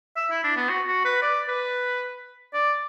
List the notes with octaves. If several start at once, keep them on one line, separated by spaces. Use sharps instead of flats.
E5
E4
D4
B3
F#4
F#4
B4
D5
B4
D5